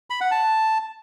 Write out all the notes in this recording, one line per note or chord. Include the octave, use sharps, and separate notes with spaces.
B5
F#5
A5